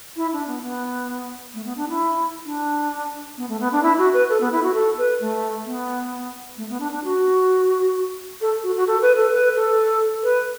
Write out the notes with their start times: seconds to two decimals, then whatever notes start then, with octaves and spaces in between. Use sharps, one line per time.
0.16 E4
0.32 D4
0.47 B3
0.63 B3
1.54 A3
1.65 B3
1.77 D4
1.89 E4
2.45 D4
3.37 B3
3.49 A3
3.60 B3
3.72 D4
3.82 E4
3.98 F#4
4.13 B4
4.29 A4
4.40 B3
4.52 E4
4.62 F#4
4.74 A4
4.98 B4
5.20 A3
5.65 B3
6.57 A3
6.69 B3
6.80 D4
6.92 D4
7.04 F#4
8.41 A4
8.63 F#4
8.76 F#4
8.87 A4
9.02 B4
9.17 A4
9.33 B4
9.55 A4
10.23 B4